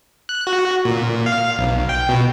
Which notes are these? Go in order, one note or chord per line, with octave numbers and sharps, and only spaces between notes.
F#6
F#4
A#2
F5
B1
G5
B2